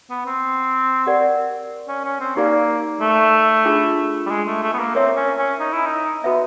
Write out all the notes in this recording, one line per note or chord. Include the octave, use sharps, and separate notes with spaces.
B3
C4
G4 A#4 D5 F#5
C#4
C#4
C4
A#3 D#4 G4 A#4 D5 F5
A3
D4 F4 G#4
G3
G#3
A3
A3
B3
A#3
C4 A#4 C#5 E5
C#4
C#4
D#4
E4
D#4
B3 F#4 B4 E5